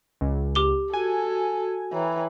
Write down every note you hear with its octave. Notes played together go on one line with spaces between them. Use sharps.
C#2
G4 D6 G7
F#4 A4 G#5
E3 C#5 G5 A#5